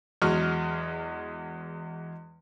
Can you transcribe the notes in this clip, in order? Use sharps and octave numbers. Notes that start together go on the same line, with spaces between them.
E2 F#3 G#3 C#6 F6